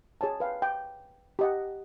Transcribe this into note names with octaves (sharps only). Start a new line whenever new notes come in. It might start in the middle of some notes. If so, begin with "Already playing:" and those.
G#4 C#5 G#5 A5
B4 F5 G5
G5
G4 D#5 F#5